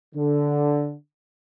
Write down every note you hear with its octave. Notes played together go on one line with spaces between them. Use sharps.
D3